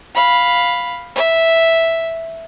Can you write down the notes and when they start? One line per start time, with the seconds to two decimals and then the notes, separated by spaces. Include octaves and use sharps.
0.15 F5 B5
1.16 E5